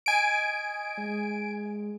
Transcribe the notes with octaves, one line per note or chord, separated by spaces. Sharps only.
D#5 G#5 D7
G#3